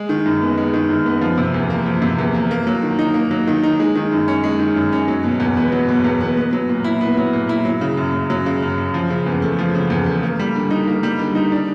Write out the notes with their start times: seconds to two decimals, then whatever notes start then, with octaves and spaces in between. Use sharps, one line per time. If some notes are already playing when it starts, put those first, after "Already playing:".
Already playing: G#3
0.09 D#3
0.26 F#2
0.42 B3
0.58 G#3
0.74 D#3
0.90 F#2
1.06 B3
1.21 F3
1.38 C3
1.54 E2
1.70 A#3
1.86 F3
2.02 C3
2.19 E2
2.34 A#3
2.51 A#3
2.67 F#3
2.83 D#3
2.99 D#4
3.14 A#3
3.31 F#3
3.47 D#3
3.63 D#4
3.80 G#3
3.95 D#3
4.12 F#2
4.28 C#4
4.44 G#3
4.59 D#3
4.76 F#2
4.92 C#4
5.08 F#3
5.24 B2
5.40 E2
5.57 B3
5.72 F#3
5.88 B2
6.04 E2
6.21 B3
6.37 B3
6.53 F#3
6.69 A#2
6.84 E4
7.01 B3
7.17 F#3
7.33 A#2
7.49 E4
7.65 F#3
7.81 C#3
7.97 F#2
8.14 F#2
8.30 F#3
8.46 C#3
8.62 F#2
8.78 F#2
8.94 F3
9.10 C#3
9.26 E2
9.42 A3
9.59 F3
9.75 C#3
9.90 E2
10.06 A3
10.23 A#3
10.39 G3
10.55 D3
10.71 D#4
10.87 A#3
11.03 G3
11.19 D3
11.35 D#4
11.52 D4